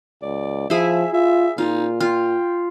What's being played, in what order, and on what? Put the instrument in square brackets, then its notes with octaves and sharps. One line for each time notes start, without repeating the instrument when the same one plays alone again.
[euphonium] C#2 [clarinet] D5
[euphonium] F3 [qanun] E4 G#4 [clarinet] E5
[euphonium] F4 [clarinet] E5
[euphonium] A#2 [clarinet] D#4 [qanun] F4
[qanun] F4 [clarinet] G5